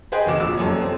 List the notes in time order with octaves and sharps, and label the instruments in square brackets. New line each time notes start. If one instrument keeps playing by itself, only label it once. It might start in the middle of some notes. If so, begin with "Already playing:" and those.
[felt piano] G#4 B4 C5 D#5 G5 G#5
E1 D2 D#5 D6 E7
F2 A#2 D6 E6
F1 F#2 A4 C#5
C4